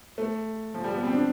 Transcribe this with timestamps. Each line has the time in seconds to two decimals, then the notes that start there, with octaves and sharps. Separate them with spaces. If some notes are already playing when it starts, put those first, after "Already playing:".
0.18 A3
0.74 F3
0.84 G3
0.94 B3
1.03 C4
1.13 D4